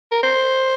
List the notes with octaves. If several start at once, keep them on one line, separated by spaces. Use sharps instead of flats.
A#4
C5